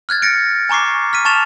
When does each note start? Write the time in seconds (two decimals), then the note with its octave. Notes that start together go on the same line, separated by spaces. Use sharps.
0.09 F6 F#6 G#6 A6
0.22 A6 A#6 C#7 D7
0.69 G#5 A#5 C#6 D6 C7
1.13 F6 B6 D#7
1.25 A5 C#6 A6 E7 F7